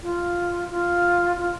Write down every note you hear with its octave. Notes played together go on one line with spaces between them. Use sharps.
F4
F4
F4